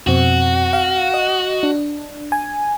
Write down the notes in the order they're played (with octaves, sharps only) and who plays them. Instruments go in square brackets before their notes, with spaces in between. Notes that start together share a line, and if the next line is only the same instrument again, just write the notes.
[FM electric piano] F2 B2 C4 [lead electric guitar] F#4
[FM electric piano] F5
D#5
D4
G#5